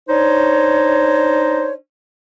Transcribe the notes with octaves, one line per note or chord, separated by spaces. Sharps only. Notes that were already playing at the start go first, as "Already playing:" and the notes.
D4 D#4 C5 C#5